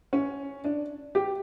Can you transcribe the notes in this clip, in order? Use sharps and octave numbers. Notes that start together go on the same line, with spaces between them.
C#4
D4
G4